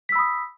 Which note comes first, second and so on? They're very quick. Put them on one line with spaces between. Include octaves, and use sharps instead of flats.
B6 E6 B5 D#6